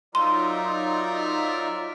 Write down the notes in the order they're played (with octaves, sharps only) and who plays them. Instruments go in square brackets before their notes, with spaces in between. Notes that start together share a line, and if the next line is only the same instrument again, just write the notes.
[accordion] F#3 D#4 F4 [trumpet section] A#4 D5 E5 [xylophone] C6